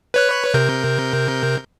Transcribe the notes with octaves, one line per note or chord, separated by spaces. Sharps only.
B4 C#5 F#6
C3 A#4 G6